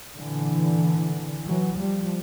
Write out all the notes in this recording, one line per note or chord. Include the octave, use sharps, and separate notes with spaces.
A#2 D3 E3
E3 F#3
F3 G3